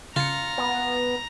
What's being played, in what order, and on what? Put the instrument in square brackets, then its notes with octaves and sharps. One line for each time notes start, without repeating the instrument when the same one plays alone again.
[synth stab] C#3 C#7 [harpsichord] F4 [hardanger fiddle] A#5
[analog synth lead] B3